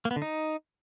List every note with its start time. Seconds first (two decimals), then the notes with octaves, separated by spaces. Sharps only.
0.05 A#3
0.11 B3
0.16 D3
0.22 D#4